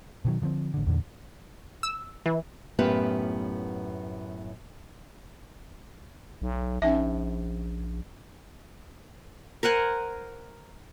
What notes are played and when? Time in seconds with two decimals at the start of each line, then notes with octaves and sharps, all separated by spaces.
0.25 B2 D#3 F#3
0.42 D3 F3 G#3 C4
0.74 A1 D3
0.87 E2 A#2 D3
1.83 E6
2.26 E3
2.79 F#2 A2 B3 F4 G4 B4
6.42 B1
6.82 A#1 C#4 D#4 E5
9.63 A#4 C5 F#5 G#5